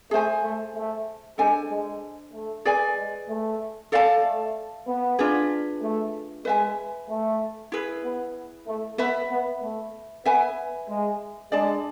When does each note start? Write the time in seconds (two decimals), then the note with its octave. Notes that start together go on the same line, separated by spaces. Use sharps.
0.11 A3 G#4 C5 G#5
0.43 A3
0.75 A3
1.38 G#3 D4 A4 C5 G#5
1.70 G#3
2.33 A3
2.65 G#4 B4 D5 G#5
2.96 G#3
3.29 A3
3.92 A4 D5 F5 A5
4.23 A3
4.87 B3
5.19 D4 F4 G#4 B4
5.82 A3
6.45 G#3 B4 E5 G#5
7.09 A3
7.72 E4 G#4 B4
8.04 B3
8.67 A3
8.98 B3 B4 E5 B5
9.30 B3
9.62 A3
10.26 B3 B4 E5 G#5
10.89 G#3
11.52 G#3 D4 G#4 D5 A5